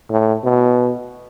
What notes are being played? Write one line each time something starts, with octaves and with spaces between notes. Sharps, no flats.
A2
B2